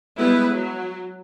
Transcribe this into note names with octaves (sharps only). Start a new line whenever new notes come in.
G3 G#3 B3 E4 B4
F#3